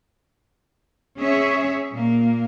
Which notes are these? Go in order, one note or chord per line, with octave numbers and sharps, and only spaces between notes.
C#4 G#4 C#5 E5
A#2 A#3